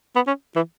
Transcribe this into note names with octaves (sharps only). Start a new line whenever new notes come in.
B3
C#4
E3